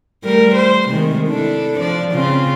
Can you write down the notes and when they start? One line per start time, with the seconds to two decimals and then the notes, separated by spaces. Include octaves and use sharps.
0.24 G3 A3 A#4
0.56 C5
0.89 C3 D#3 G#3
1.28 D4 E4 A4
1.78 F3 D4 D5
2.13 C#3 C4 F4